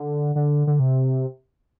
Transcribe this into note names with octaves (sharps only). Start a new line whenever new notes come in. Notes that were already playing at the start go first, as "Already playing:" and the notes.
Already playing: D3
D3
D3
C3